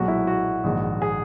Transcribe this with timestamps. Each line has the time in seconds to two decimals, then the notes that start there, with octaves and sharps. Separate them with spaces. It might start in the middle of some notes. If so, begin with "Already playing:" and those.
Already playing: B1 A#2 G#3 F#4
0.08 E4
0.27 F#4
0.64 A#1 G#2 D#3
1.02 G#4